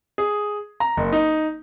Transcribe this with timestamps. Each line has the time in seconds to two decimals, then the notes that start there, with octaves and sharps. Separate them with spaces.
0.18 G#4
0.80 A#5
0.97 F#1
1.12 D#4